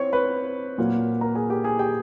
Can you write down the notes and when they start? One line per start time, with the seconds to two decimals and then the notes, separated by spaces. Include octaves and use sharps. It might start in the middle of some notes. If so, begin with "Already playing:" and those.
Already playing: C4 C5 C#5 C#6
0.13 B4 B5
0.78 A#2 F#3 A#3
1.21 A#4 A#5
1.35 G#4 G#5
1.50 G4 G5
1.64 G#4 G#5
1.79 G4 G5